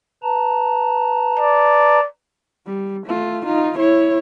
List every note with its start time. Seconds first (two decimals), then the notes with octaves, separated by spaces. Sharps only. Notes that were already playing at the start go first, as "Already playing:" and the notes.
0.23 B4 A5 A#5
1.40 D5
2.66 G3
3.07 A3 F4
3.46 D#4 F4
3.78 E4 C#5